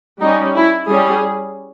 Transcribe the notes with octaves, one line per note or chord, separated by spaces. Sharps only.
G3 C#4 D#4
E4
G3 C#4 G#4